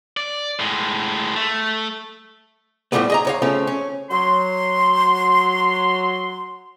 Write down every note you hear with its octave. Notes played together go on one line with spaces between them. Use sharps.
D5
A2 G#3
A3
A2 E3 F3 G3 A3 B3
G#4 D#5 A#5
D2 C#5 F5
C#3 F3 A3 C4 C#4
C#4
F#3 C6